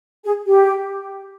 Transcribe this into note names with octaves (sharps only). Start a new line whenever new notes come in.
G#4
G4